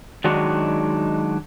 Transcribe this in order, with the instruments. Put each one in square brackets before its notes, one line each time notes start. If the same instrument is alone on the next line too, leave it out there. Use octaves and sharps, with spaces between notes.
[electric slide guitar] D#3 F#3 G#3 D4 D#4 F#4